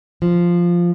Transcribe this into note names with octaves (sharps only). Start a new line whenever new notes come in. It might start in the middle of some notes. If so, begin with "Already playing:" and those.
F3